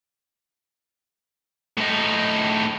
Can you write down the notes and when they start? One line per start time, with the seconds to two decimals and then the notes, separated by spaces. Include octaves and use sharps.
1.77 A2 D#4